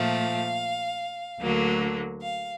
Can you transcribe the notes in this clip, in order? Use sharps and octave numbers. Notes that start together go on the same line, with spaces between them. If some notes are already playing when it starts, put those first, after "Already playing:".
Already playing: A#2 F3 A3 F5
D2 D3 F#3 A#3
F5